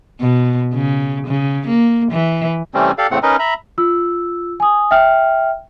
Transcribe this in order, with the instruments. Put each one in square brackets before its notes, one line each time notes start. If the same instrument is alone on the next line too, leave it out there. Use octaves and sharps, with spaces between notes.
[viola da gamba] B2
C#3
C#3
A#3
E3
[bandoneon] C3 E3 G3 A3 C4 C#4
G4 A4 D5 F5
E2 A2 C#3 A3 C4 F#5
C#4 D#4 A#4 B4 D#5
E5 A#5 B5
[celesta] F4 E6
G#5 D#6
E5 G5 F6